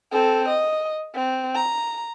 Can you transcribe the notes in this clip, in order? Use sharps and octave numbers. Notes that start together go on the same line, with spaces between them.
C4 A4
D#5
C4
A#5